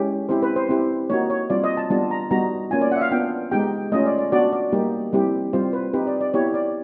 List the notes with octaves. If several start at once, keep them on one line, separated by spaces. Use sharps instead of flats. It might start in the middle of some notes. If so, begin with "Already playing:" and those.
Already playing: G#3 C#4 E4 G4
C4 E4 G4 C5
B4
C5
C4 E4 G4
A#3 D#4 F#4 C#5
C#5
G3 C4 F4 D5
D#5
A5
G3 B3 D4 F4 A5
A#5
G3 B3 D#4 F#4 A#5
A#3 C#4 F4 G#5
D5
F#5
E5
F5
B3 D4 F4 G5
G#3 B3 D#4 G4 G5
A3 C#4 F4 D#5
D5
D5
B3 D4 F#4 D5
D5
G3 A#3 D#4 G4
G3 C4 E4 G4
G3 C4 F4 C5
B4
C4 D#4 G4 B4
D5
D5
B3 E4 G4 C#5
D5